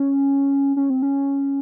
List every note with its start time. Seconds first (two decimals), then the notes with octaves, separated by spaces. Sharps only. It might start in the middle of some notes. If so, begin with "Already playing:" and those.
Already playing: C#4
0.76 C#4
0.90 C4
1.02 C#4